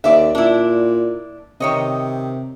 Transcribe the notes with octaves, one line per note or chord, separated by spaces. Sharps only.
D#2 D5 E5
A#2 D4 E4
C3 D#3 C#5 D#5